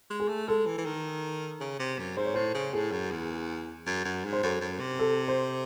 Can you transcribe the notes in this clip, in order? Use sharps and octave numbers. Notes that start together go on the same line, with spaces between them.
G#3
G#4
A3
G#3 A4
E3
E3
D#3
C#3
C3
F#2
G#2 C5
C#5
A2 C5
C#3
A2 G#4
F#2
E2
F#2
F#2
G#2
C5
F#2 A4
F#2
C3
A4
C5